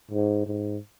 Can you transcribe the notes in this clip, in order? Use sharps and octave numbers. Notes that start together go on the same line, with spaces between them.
G#2
G#2